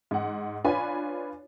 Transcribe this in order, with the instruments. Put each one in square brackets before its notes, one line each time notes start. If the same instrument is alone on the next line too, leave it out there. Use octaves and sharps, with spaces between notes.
[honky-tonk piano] G#2 F#5
D4 F4 B4 C#5 G#5 B5